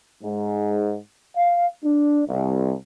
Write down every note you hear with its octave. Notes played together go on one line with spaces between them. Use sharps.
G#2
F5
D4
C2